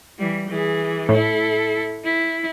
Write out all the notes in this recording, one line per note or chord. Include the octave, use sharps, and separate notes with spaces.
E3 G3
E3 G#4
A2 E4 A4
E4